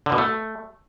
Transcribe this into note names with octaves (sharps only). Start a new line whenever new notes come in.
D3
B2
A3